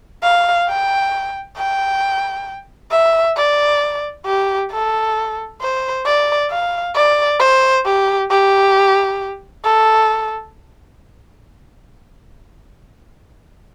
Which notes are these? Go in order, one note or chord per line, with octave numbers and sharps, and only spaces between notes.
F5
G5
G5
E5
D5
G4
A4
C5
D5
F5
D5
C5
G4
G4
A4